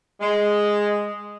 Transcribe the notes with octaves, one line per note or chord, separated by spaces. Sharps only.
G#3